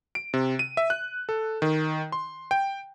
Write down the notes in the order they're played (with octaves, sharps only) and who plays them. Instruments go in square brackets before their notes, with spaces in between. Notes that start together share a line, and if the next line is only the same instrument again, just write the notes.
[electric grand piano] D7
C3
D#7
E5
F#6
A4
D#3
C6
G5